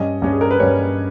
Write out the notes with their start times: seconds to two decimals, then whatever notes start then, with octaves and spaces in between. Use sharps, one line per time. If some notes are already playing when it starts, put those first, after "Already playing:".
Already playing: G2 G3 C#4 D#5
0.22 G2 G3 C#4
0.32 G#4
0.41 A#4
0.51 B4
0.60 G2 G3 C#4 C#5